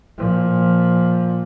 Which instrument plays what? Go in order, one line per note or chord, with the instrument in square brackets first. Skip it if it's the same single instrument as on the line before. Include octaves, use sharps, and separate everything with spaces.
[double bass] A#2 F3